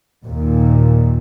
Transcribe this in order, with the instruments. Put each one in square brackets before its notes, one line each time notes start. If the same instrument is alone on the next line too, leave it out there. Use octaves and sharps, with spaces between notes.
[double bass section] D#2 A#2